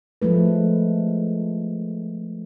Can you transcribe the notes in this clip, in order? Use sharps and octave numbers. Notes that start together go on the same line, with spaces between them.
F3 G#3 A3 B4